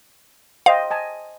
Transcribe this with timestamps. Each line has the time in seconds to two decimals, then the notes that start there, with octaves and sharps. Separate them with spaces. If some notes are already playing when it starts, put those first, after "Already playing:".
0.66 C5 D#5 F5 G5
0.90 D#5 G#5 A5